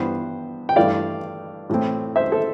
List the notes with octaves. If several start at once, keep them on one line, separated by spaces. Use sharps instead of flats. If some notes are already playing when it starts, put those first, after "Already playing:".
Already playing: G2 E3 B3 C5
G5
G2 E3 A3 D5 F5
A2 E3 A3 C4
C5 E5
A4 C5